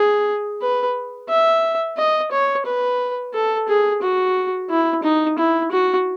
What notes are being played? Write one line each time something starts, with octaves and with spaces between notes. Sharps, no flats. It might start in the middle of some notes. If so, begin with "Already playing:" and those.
Already playing: G#4
B4
E5
D#5
C#5
B4
A4
G#4
F#4
E4
D#4
E4
F#4